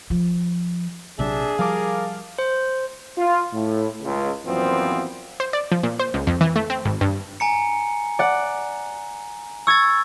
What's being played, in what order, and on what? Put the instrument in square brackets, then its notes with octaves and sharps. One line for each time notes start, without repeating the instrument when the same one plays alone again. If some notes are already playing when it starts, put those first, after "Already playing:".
[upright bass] F3
[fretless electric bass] A#1 C3 F#3 [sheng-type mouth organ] D4 E5 [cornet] G#4
[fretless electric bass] F3 G3 [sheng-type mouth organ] A#4 [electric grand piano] F5 A5 D6
[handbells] C5
[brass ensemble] F4
A2
C#2
F#2 A#2 E3 F3 B3 C4
[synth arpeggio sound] C5
D5
F3
A#2
C5
C#2
F2
E3
A3
C4
G#1
G2
[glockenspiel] G#5 A#5 C#7
[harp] D5 F#5
[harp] C#6 G#6 [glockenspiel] E6 A6